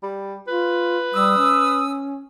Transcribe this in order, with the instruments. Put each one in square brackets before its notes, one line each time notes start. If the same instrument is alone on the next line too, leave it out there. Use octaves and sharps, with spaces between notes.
[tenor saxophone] G3
[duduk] F4 [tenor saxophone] B4
[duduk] G3 [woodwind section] D#6 E6
[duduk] C#4